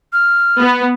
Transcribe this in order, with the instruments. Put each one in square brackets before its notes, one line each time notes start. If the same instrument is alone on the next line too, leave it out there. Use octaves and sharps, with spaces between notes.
[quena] F6
[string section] B3